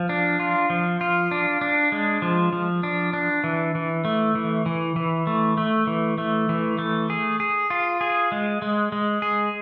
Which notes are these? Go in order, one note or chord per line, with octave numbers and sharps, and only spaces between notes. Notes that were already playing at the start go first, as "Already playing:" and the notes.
Already playing: F3
D4
F4
F3
F4
D4
D4
G#3
F3
F3
D4
D4
E3
E3
A3
E3
E3
E3
A3
A3
E3
A3
E3
A3
G#4
G#4
F4
G#4
G#3
G#3
G#3
G#4